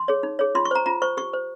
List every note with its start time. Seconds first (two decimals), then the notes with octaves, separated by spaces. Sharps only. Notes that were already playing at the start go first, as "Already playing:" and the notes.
Already playing: C6
0.08 G#4 C#5
0.23 D#4
0.39 G#4 C#5
0.55 F4 C6
0.65 C#6
0.71 C5 A#5
0.86 F4 A#5
1.02 C5 C#6
1.17 G4 C#6
1.33 C5